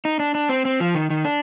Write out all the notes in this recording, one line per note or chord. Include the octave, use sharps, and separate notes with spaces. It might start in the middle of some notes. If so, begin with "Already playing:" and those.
D#4
D4
D4
C4
C4
F3
D#3
D#3
D4